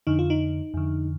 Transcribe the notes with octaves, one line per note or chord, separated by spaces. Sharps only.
F2 D3 D#4
F4
D#4
F2 D3